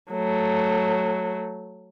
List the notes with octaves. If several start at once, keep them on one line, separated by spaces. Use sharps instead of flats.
F#3 A3